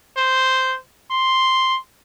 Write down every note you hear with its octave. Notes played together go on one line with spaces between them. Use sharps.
C5
C6